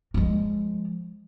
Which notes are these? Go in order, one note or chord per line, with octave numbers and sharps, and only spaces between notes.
F3 G#3